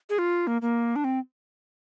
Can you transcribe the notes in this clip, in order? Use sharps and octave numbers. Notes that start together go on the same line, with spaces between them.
G#4
F4
A#3
A#3
D4
C4